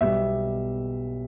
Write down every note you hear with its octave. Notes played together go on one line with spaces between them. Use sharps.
B1 B2 G3 E5